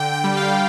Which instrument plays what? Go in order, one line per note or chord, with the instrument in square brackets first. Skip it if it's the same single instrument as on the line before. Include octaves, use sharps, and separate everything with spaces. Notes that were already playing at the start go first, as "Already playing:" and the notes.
Already playing: [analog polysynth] D3 G5
G5
G3
F5